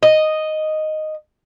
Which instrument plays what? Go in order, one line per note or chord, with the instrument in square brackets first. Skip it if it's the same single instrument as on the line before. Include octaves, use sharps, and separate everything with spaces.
[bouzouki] D#5